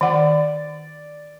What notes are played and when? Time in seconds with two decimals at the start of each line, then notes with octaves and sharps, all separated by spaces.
0.01 D#3 D5 F#5